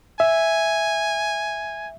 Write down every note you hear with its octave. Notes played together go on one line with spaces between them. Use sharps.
E5 G#5